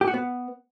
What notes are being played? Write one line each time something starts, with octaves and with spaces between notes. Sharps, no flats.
G4
F#4
B3